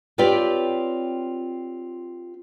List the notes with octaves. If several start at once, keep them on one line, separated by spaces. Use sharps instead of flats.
C4 F4 G4 B4 C#5 D5